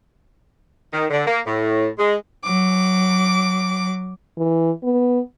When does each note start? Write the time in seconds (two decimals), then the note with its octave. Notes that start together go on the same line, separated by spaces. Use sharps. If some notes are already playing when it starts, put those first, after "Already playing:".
0.93 D#3
1.10 D3
1.27 A#3
1.46 A2
1.99 G#3
2.44 F#3 D6
4.37 E3
4.84 B3